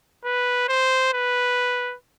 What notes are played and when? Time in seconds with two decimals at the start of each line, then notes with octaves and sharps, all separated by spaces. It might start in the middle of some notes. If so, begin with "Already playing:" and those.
0.25 B4
0.69 C5
1.13 B4